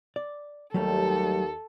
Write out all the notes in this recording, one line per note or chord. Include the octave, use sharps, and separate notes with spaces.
D5
D#2 F#3 G3 A3 A4